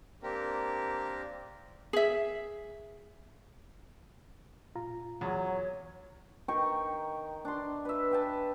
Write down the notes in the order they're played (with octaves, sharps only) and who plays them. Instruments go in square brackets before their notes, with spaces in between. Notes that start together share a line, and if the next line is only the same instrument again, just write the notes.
[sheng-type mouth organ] A#3 C4 D4 G4 A#4
[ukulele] G#4 E5
[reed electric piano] A#2 F4 A#5
[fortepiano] E2 [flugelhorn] F#3 [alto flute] C#5
[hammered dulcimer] D#3 G5 A#5 C#6
D4 C6
B4 E5
B4 G5 A5